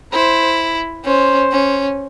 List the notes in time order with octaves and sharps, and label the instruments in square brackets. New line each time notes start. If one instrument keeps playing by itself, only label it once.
[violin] E4 [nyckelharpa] C5
[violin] C#4 [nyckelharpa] C5
[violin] C#4